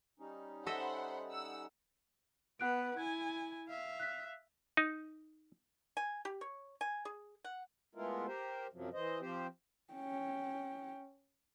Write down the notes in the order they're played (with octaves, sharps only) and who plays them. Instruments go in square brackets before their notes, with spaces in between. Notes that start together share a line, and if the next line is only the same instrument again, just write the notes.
[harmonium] G3 C#4 D#4
[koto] A4 D#5 E5 [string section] C5 F#5 B5
[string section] F#5 E6
[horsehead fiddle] B3 B4 [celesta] F#5 F#6 D7
[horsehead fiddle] E4 G#5 [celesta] G#6
[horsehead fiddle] E5 F5
[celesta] F#6 B6
[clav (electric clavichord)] D#4
[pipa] G#5
G4
C#5
G#5
G#4
F#5
[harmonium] G#3 A3 B3 E4 F4 A#4
G4 A#4 C5
F#2 C3 F3 F#3
E3 C5 D#5
F3 C4 G4 C5
[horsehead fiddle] C#4 G5